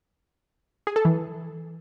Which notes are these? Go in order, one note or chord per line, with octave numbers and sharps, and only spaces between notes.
G#4
A4
E3